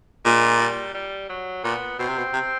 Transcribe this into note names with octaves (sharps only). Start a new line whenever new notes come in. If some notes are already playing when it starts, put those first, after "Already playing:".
A#2 G#3
G3
G3
F#3
A#2 B3
B2 C4
C3
B2
C3